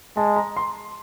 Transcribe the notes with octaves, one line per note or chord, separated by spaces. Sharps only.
G#3 A5
A#5
C6